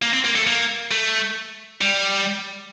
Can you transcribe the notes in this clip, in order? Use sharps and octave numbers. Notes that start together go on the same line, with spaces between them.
A#3
C4
A#3
A3
A#3
A3
G3